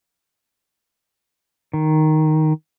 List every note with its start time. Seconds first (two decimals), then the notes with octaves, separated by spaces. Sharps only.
1.73 D#3